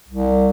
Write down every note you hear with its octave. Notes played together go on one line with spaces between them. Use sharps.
C2